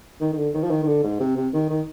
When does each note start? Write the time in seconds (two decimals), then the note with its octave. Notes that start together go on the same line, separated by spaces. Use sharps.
0.21 D#3
0.33 D#3
0.38 D3
0.54 D#3
0.63 F3
0.71 D#3
0.83 D#3
0.87 D3
1.04 G#2
1.20 C3
1.37 C3
1.53 D#3
1.70 D#3